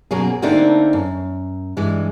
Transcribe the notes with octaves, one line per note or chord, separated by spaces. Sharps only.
F#2 B2 F#3 A#3 G#4
D3 A3 A#3 C4 D4 D#4
F#2
G2 E3 G#3